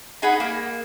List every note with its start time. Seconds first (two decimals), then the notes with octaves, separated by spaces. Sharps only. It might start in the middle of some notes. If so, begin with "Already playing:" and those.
0.22 D#4 G#4 F#5 B5
0.40 A#3